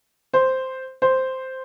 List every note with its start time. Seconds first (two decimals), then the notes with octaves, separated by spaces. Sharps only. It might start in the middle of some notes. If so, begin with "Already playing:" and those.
0.33 C5
1.02 C5